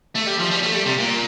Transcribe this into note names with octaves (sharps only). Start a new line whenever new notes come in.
A3
G3
F3
G3
A3
G3
C3
A#2